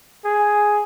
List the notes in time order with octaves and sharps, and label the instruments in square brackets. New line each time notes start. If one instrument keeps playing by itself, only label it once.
[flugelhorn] G#4